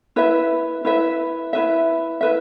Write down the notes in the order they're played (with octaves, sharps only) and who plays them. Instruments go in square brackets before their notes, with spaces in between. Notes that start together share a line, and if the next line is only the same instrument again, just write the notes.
[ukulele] E4 B4 E5
E4 B4 E5
E4 B4 E5
E4 B4 E5